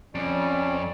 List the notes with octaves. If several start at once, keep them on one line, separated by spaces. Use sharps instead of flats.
F2 C#4 D5